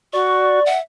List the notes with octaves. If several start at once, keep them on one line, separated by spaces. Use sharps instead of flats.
F#4 D5 C#6
E5 F#5